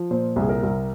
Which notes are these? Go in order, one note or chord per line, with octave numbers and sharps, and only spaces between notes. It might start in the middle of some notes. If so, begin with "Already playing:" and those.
Already playing: F3
A#2 C5
C2
G#4
A#4
C2